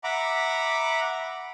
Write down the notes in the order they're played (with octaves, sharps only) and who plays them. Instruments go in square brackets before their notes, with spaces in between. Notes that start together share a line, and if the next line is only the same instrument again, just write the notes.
[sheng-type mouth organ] E5 F#5 A#5 B5 D6